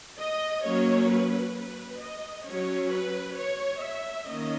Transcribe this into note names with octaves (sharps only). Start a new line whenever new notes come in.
D#5
F#3 A#3 C#4 C#5
B4
B4
D#5
F#3 C#4 C#5
B4
C#5
E5
D#3 A#3 C#4 D#5